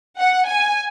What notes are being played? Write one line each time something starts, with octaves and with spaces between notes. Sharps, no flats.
F#5
G#5